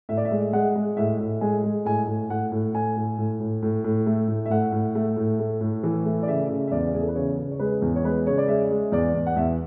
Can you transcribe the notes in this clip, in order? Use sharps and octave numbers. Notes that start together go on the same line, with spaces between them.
A2 E5
D5
E5
G#3
G#3 F#5
G#3
A2 E5
A2
G#3 G#5
G#3
A2 G#5
A2
A2 F#5
A2
A2 G#5
A2
A2
A2
A2
A2
A3
A2
E5
A2 F#5
A2
A3
A2
A3
A2
E3
A3
D5
C#3 E5
C#3
E5
E2 D5
E2 G#4
A4
B4
C#3 C#5
C#3
C#5
G#3 B4
E2
C#5
G#3 B4
C#3 C#5
D5
G#3 E5
G#3
E2 D5
E2
F#5
E2 E5